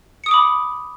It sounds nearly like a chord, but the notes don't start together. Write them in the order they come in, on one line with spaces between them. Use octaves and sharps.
C#7 D#6 D7 D6 B5